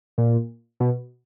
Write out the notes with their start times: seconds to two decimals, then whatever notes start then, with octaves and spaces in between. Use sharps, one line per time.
0.18 A#2
0.80 B2